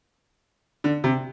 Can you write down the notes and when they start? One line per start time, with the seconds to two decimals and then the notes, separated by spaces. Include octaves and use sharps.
0.84 D3
1.04 C3